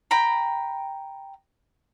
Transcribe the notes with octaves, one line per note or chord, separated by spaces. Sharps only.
G5 A#5 B5